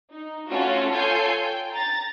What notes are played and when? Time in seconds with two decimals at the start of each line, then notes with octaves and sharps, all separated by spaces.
0.11 D#4
0.48 A3 C#4 F4 F#4
0.92 F4 A4 C#5 G#5 G6 C7
1.43 G5
1.73 A#5 A6